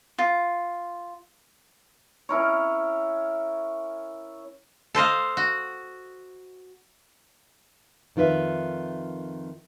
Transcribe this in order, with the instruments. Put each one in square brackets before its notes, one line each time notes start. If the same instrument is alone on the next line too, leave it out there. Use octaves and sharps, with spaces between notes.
[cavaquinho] F4
[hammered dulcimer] C#4 E4 A#4 C#5
[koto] A4 C5 D#5 F5
F#4
[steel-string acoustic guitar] F2 D#3 F4 B4 E5